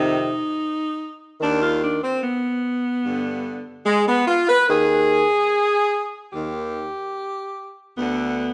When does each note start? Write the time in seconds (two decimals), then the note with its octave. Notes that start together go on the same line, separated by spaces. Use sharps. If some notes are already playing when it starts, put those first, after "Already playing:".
Already playing: F2 C3 D#3 D#4
1.40 D#2 D#3 D4
1.60 F4
1.82 D4
2.02 C4
2.21 B3
3.03 G2 D3
3.85 G#3
4.06 B3
4.27 F4
4.47 B4
4.67 D#2 D#3 G#4
6.31 D#2 D#3 G4
7.95 D2 D3 B3